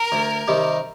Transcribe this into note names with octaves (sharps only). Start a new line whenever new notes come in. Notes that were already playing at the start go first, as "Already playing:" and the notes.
Already playing: A#4
D2
C3 D#3 G3